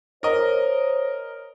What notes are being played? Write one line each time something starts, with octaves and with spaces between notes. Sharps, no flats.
A#4 C5 C#5 D#5